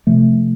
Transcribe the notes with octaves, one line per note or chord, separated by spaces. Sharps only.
C3 F3 A3